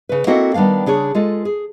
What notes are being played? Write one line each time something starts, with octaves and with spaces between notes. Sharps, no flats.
C#3 B4
A#3 C4 E4 F#4 A4 D#5
D#3 G3 B3 D4 F5
C#3 D4 G#4 C#5
G#3 F4 A4
G#4